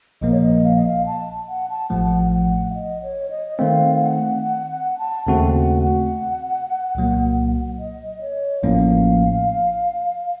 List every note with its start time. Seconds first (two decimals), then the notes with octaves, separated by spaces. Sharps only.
0.22 A#1 A#2 F3 A#3 D#5
0.32 C#5
0.41 D#5
0.65 F5
0.76 D#5
0.87 F5
1.06 A5
1.48 F#5
1.69 A5
1.90 A1 A2 F3 A3 F#5
2.32 F#5
2.70 F5
2.75 D#5
3.02 C#5
3.30 D#5
3.59 D#3 A3 C4 F5
4.00 F#5
4.43 F#5
4.70 F#5
4.99 A5
5.27 D#2 C#3 A3 C4 F#4 F#5
5.55 F#5
5.83 F#5
6.95 C2 A#2 F#3 A#3
7.79 D#5
8.21 C#5
8.63 A1 A2 F3 A#3 C#4 F5